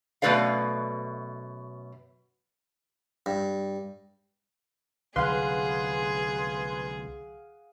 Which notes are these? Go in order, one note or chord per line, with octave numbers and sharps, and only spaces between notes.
F#2 B2 A3 B4 D5 F5
G2
C2 D3 F#3 G#4 B4 F5 F#5 C6